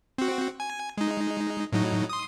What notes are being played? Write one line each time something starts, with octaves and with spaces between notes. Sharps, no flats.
C4 F#4
G#5
G#3 D#4
A2 F#3 D#4
C6 D#6